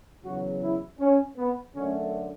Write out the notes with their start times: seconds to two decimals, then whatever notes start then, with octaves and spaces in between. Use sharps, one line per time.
0.22 E2 C#3 F#3 F#4
0.61 E4
0.99 C#4
1.37 B3
1.75 F#2 D3 A3 C#4